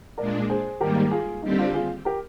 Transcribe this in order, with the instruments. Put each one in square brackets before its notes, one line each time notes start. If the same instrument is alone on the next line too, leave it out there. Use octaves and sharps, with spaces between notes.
[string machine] A#2 G#3 D4 [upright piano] A#4 D5
[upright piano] G#4 C5
[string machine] G#2 D#3 G3 A#3 [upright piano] G4 A#4
[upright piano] F4 G#4
[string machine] D#2 D3 G3 C4 G4 [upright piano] D#4
[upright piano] D4 F4
F4 G#4
G4 A#4